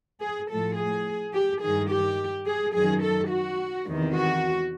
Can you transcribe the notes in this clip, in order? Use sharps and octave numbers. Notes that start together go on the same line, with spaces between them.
G#4
A2 F3 A4
G#4
G4
G2 D#3 G#4
G4
G#4
F#2 D#3 G#4
A4
F#4
E2 C3 D#3
F#4